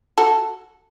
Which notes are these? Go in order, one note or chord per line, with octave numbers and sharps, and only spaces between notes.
F#4 A4